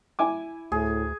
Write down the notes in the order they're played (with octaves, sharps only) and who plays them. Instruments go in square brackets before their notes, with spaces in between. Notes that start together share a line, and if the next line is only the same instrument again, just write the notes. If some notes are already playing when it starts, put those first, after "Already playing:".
[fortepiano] E4 G#5 D6
[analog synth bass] D2 [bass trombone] A2 [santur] G#4